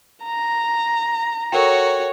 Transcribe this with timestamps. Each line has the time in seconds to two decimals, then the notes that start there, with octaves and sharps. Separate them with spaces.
0.23 A#5
1.52 F#4 A4 A#4 C#5 G5